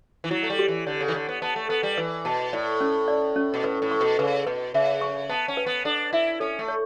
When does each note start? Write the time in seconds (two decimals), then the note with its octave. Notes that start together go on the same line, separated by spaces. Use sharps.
0.24 E3
0.31 F#3 E4
0.43 A3
0.50 G3
0.59 G4
0.68 E3
0.86 D3 C#5
1.00 C#3
1.08 E3
1.14 D3 C#5
1.28 B3
1.42 B3 A5
1.56 A3
1.69 B3 B4
1.83 G3
1.97 E3 B4
2.25 B2 A5
2.53 A2 D5
2.81 C#4
3.08 D5
3.36 C#4
3.54 B2
3.64 A2 B4
3.82 A2
3.91 C#6
4.01 B2
4.19 C#3 B4
4.47 B2 B4
4.74 C#3 E5
5.01 C#6
5.29 B3 A5
5.48 C#4
5.57 B4
5.66 B3
5.85 D4 A4
6.13 E4 E5
6.40 C#4 A4
6.59 A3
6.68 C#5